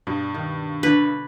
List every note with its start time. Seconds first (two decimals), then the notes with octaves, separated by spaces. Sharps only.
0.07 G2 B2
0.34 D#3
0.83 D3 B4